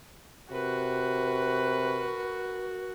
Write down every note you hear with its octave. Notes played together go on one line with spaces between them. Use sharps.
C3 F#4 A#4 B4